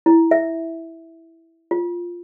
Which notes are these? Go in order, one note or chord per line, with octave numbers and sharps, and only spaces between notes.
E4
E5
F4